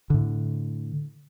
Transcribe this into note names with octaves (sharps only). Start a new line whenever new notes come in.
A2 D3